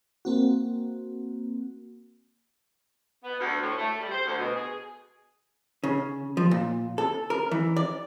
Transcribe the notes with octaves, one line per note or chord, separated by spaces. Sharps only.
A#3 C4 F#4
B3
D2
A2
A3
G3
C5
D2
B2
G#4
C#3
F3
A#2
A4
A#4
E3
D5